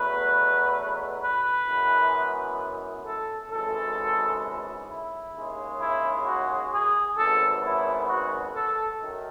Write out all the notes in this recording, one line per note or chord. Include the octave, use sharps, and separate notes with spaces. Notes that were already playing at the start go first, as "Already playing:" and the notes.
Already playing: E2 B2 F#3 A3 B4
B4
F#2 E3 G#3 B3
A4
G#1 F#2 C#3 E3 G#3 A4
E4
D#2 C#3 G#3
E4
F#4
G#4
G#1 F#2 C#3 G#3 B3 A4
E4
F#4
A4
F#2 D#3